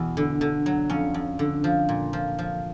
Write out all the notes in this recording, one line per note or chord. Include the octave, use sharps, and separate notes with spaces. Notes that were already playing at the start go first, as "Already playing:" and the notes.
Already playing: E2 B2
D3
D3
F#3
F2 C#4
F2
D3
F3
A#2
F3
F3